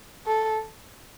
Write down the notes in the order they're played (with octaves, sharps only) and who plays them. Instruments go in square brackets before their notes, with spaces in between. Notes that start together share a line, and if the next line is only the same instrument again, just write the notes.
[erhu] A4